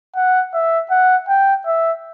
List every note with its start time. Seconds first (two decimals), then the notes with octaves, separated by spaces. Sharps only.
0.16 F#5
0.54 E5
0.91 F#5
1.28 G5
1.66 E5